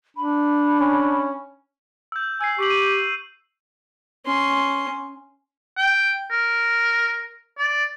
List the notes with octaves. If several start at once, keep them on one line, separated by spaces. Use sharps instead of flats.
D4 B5
C#4
E6 G6
G#5 E6 C7
G4 C#6 C7 F#7
D#7
C#4 C6
G5
A#4
D5